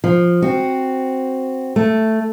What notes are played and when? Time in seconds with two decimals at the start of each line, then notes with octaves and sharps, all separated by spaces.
0.04 F3
0.42 C4 F#4
1.76 A3